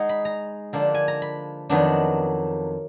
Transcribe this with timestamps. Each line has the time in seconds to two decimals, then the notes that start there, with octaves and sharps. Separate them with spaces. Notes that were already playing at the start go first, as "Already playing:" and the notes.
Already playing: G#3 D#4 F#5
0.09 B5
0.25 A#5
0.73 D3 F3 A#3 D4
0.94 G#5
1.08 A#5
1.22 B5
1.69 F2 D#3 F#3 B3 D4